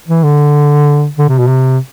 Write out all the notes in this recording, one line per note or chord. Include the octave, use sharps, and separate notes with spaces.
E3
D3
D3
C3
B2
C3